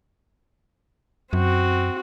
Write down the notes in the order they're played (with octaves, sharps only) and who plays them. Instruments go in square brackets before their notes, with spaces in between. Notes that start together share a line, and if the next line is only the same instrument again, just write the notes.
[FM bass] F#2 [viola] C4 F#4